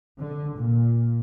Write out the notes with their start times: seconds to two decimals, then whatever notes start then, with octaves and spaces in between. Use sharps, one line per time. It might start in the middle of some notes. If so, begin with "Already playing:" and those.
0.19 D3
0.57 A#2